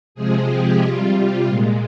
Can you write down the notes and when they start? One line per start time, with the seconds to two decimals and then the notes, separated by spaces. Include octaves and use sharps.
0.15 C3 F3 G#3 G#4
0.48 G4
0.81 C3 G3 F4
1.46 A#2 G#3